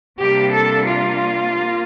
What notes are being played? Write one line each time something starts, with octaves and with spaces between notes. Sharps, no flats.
C3 G3 A#3 D4 G4
A4
F4
A#3